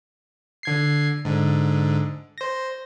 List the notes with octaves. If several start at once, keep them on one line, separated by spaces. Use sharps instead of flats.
D3 G#6 C7
G#2 D3
C5 A#6